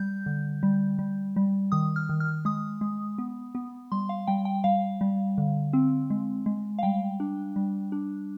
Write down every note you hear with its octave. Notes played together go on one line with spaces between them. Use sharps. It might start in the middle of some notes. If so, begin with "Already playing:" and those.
Already playing: G3 G6
D3
G3
G3
G3
D#3 D#6
F6
D#3
F6
G#3 D#6
G#3
B3
B3
G3 C6
F5
G3 G5
G5
G3 F5
G3
D3
C4
G#3
G#3
F5
G3 G5
D4
G3
D4